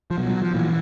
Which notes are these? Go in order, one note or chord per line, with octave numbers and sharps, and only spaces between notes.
F3
B2 F#3
F#3
F3
A#2 E3